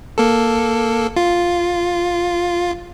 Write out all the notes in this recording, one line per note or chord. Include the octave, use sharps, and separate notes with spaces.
A#3 A4
F4